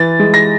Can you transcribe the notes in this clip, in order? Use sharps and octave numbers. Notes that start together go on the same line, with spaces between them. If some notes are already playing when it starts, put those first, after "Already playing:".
Already playing: E3 A6
G#3
A#6